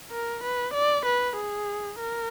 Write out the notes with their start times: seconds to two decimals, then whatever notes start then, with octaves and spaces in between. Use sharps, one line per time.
0.11 A#4
0.43 B4
0.74 D5
1.06 B4
1.37 G#4
1.99 A#4